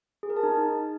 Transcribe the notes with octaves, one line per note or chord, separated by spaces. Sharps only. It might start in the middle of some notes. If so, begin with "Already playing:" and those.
G#4
A#4
A5
D#4